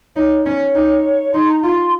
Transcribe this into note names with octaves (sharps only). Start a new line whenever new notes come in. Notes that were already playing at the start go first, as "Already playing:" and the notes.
D#4 C#5
C#4 C#5
D#4
D#4 C6
A#5
F4 C6